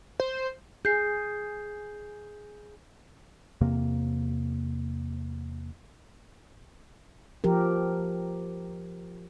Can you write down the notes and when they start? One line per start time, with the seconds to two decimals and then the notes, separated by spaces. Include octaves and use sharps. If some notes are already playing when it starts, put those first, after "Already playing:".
0.20 C5
0.85 G#4 G6 C7
3.61 E2 C3 A#3
7.44 F3 G4 A#4